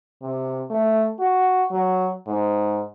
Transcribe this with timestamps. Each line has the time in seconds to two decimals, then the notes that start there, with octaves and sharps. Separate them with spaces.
0.22 C3
0.70 A3
1.20 F#4
1.71 F#3
2.27 G#2